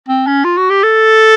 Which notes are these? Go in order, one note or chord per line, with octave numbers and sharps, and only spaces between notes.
C4
C#4
F4
F#4
G4
A4